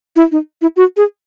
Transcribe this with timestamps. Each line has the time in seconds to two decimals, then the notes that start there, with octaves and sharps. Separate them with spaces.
0.16 E4
0.32 D#4
0.62 E4
0.76 F#4
0.97 G#4